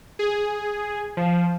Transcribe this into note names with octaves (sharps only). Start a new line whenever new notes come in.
G#4
F3